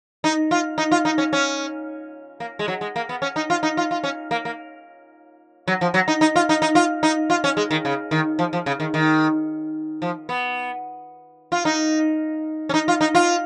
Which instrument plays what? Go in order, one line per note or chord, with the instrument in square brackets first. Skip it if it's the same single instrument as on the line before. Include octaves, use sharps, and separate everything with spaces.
[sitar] D#4
F4
D#4
F4
D#4
C#4
C#4
A#3
G#3
F#3
G#3
A#3
B3
C#4
D#4
F4
D#4
F4
F4
C#4
A#3
A#3
F#3
F3
F#3
D#4
D#4
F4
D#4
D#4
F4
D#4
F4
C#4
G#3
D#3
C#3
D#3
F3
F3
C#3
D#3
D#3
F3
B3
F4
D#4
C#4
D#4
F4
D#4
F4